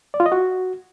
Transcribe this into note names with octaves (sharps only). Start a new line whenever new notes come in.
D5
F4
D#5
F#4